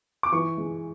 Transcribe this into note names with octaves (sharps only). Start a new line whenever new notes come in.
D6
E3 C#6
G#3